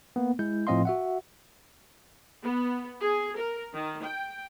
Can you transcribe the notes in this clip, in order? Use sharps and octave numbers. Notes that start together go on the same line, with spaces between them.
A#3 B3
G#3 E4 G6
A2 F3 C4 D#5 F5 C6
F#4 E5 F#5
B3
G#4
A#4
D#3
G5